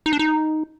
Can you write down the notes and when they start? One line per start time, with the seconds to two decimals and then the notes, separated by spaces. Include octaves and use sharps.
0.06 D#4
0.13 D4
0.19 D#4